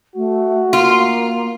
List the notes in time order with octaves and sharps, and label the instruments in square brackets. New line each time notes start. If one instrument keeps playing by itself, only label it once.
[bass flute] A3 [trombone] F#4
[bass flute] A#3 [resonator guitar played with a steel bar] F4